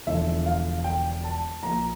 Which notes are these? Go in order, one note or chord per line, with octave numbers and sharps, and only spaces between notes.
E1 E2 D3 F3 E5
F5
G5
A5
A#1 A#2 F3 A#5